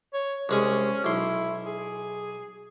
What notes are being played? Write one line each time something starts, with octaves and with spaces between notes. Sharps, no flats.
C#5
C2 G#3 C#4 G#4
B1 E4 C6
G#4